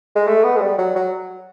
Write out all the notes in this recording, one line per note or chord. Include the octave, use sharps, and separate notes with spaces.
G#3
A3
B3
G#3
G3
F#3
F#3